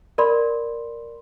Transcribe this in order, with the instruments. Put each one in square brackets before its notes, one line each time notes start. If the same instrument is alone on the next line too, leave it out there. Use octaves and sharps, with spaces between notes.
[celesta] A#4 D5 B5 C6